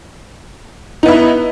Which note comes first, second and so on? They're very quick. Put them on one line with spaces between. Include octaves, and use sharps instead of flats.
D#4 B3 E4